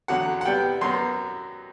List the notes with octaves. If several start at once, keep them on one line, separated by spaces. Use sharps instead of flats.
E2 D3 F#3 F#5
F#5
C3 G3 B3 G5
F#2 F#3 B3 C6